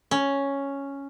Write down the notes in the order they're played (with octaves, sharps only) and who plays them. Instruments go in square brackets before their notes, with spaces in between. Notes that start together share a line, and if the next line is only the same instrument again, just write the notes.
[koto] C#4